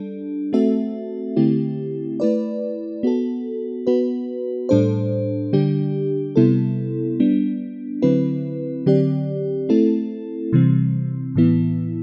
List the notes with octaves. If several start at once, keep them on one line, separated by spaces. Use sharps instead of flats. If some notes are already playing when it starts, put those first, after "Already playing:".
Already playing: G3 D4 A4
A3 C4 F#4 A4 E5
D3 A3 C4 E4 G4
A3 E4 B4 D5
B3 F#4 A4
B3 F#4 B4
A2 G3 D4 A4 C5
D3 G3 D4 G4
C3 G3 B3 E4 A4
G3 B3 D4
D3 F#3 C4 E4 B4
D3 F#3 C4 G4 D5
A3 C4 E4 A4
C3 E3 G3 C4
A2 E3 B3 E4